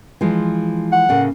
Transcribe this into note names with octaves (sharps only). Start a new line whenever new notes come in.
E3 F3 G#3
F#5
A2 C#3 A#3